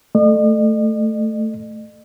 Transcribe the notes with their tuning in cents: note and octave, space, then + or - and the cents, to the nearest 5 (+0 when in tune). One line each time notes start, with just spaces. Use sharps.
A3 +0 D#5 -45